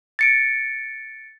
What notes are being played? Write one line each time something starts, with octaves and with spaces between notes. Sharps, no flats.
A6 C#7 D7